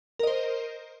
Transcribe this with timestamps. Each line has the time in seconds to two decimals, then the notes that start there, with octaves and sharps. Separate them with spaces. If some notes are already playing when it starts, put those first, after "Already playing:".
0.19 A#4
0.23 D#5
0.27 C5